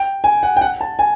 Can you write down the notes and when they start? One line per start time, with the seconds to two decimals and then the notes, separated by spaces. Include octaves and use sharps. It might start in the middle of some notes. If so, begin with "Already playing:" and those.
Already playing: G5
0.24 G#5
0.43 F#5
0.57 G5
0.61 F#5
0.81 A5
0.99 G#5